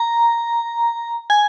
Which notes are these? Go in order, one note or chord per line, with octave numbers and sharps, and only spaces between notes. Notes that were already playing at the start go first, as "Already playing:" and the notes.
Already playing: A#5
G#5